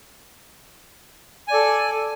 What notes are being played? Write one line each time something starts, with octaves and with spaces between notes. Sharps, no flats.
A4 D5 G#5